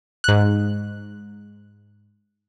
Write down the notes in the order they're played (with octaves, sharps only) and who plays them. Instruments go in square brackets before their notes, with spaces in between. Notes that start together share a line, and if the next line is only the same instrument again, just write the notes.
[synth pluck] G#2 F#6